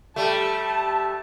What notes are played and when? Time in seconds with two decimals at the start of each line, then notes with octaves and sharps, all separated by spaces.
0.16 G3 A3 A5